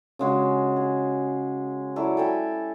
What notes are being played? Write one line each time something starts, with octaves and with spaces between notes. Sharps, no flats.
C#3 G#3 F#4
G#4
F#3 E4 A4 D5
A4 G5 G#5 B5